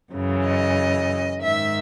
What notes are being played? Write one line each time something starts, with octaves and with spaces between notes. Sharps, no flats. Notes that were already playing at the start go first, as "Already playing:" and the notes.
F#2 C#3 E3
D#5
G#2 D#3 E5